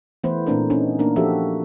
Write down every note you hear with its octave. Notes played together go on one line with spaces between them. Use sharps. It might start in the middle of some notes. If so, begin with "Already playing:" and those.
E3 A3 B3 E4 B4 C5
A#2 A3 C4 D4 A#4
B3 C#4 D#4
A#3 D4 A#4
F3 F#4 G4 A4 E5